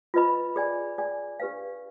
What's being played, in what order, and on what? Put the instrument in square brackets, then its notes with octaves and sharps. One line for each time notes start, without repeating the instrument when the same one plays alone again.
[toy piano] F4 B4 D#5 B5
G#4 D5 G#5
G#4 D5 G#5
D4 G4 B4 F5